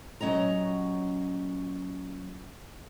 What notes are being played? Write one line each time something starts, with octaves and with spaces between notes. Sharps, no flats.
A#2 F#3 C#4 D#5 A#5